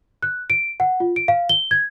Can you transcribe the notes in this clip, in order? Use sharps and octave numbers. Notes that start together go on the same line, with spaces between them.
F#6
D7
F#5
F4
D7
F5
G7
G#6